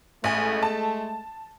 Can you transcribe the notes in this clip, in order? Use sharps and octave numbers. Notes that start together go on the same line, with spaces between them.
A1 G#3 A3 G#5
A5